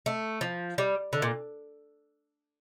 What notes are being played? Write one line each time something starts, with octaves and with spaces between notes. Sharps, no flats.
A3
F3
G3
D3
A#2